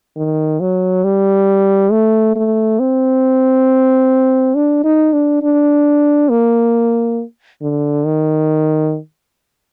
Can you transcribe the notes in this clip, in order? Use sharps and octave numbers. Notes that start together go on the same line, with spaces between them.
D#3
F#3
G3
A3
A3
C4
D4
D#4
D4
D4
A#3
D3
D#3